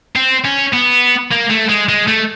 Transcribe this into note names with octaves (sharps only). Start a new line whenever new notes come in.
C4
C#4
B3
A#3
A3
G#3
G#3
A3